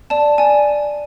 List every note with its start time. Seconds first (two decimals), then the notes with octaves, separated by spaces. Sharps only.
0.10 D5 A5
0.38 D5 G#5